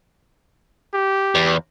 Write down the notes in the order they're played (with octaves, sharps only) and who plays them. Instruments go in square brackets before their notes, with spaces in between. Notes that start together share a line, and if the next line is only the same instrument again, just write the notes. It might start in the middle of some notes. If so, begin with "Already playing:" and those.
[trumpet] G4
[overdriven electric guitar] E2